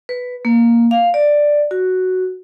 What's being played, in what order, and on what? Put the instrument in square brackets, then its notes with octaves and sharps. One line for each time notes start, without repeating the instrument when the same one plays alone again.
[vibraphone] B4
A#3
F5
D5
F#4